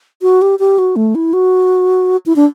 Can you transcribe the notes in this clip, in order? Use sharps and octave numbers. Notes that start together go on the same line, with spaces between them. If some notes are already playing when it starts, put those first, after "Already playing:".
F#4
G4
G4
F#4
A3
E4
F#4
E4
D4